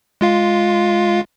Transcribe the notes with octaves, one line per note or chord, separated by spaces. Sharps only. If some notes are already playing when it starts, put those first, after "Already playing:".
G#3 F4 F5